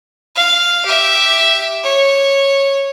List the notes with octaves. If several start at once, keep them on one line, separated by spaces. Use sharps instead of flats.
F5
G4 E5
C#5